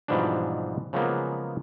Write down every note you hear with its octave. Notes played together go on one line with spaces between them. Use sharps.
G#2 B2 E3 F3 G3 D4
C#3 F3 F#3 G#3 A#3 B3